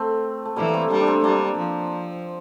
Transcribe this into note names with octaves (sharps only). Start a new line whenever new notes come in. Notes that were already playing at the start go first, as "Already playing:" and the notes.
Already playing: A3 C4
A3
E3 G3 A#3
A#3
A3 C4
G3 A#3 D4
D4
A3 C4
G3 A#3 D4
F3